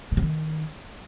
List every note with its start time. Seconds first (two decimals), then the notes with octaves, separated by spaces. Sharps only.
0.12 A#2
0.17 C3
0.22 D#3